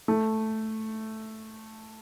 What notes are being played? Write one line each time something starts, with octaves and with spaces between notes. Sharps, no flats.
A3